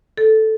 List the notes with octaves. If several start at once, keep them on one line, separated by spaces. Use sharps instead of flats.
A4